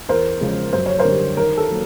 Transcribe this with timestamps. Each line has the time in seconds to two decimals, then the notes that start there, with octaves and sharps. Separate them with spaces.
0.09 E2 A#4 C5
0.41 C#3 F3 G#3
0.73 F#2 C5
0.86 C#5
0.98 A#4 C5
1.05 D3 G3
1.37 D#3 A#4
1.57 A4
1.69 F#3 A#3